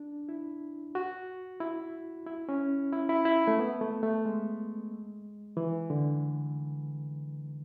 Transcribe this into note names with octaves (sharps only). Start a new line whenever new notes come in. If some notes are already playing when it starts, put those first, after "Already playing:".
Already playing: D4
E4
F#4
E4
E4
C#4
E4
E4
E4
A3
B3
A3
A3
G#3
E3
D3